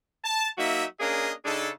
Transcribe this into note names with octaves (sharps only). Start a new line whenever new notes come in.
A5
F#3 A#3 D#4 F#4 E5
A#3 C#4 D4 G#4 A#4 D#5
C#3 D4 D#4 G#4 A4